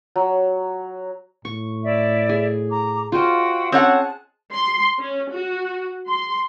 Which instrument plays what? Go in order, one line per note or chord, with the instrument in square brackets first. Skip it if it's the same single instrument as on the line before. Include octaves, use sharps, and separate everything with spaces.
[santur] F#3
[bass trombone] A2 [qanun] C#6
[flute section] E4 D5 E5
[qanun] G#4
[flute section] A#5 D6
[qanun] F4 C5 D#5 [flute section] F#4 F5 G5
[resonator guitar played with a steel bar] C4 C#5 F#5 [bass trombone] C#4 [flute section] G#4 A5 F#6
[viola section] C6
C#4
F#4
C6